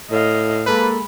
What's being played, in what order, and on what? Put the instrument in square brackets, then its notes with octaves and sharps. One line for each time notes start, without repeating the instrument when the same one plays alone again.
[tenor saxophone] A2 [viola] D#5 F5
[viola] G#3 B5 [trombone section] A#3 A4 [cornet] B4